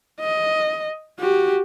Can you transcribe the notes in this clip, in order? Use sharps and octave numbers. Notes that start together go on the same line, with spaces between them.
D#5
F#4 G4